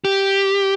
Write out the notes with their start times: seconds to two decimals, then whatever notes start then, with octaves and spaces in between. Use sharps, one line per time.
0.05 G4